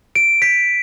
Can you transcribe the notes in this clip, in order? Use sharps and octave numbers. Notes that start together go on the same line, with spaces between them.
D7
B6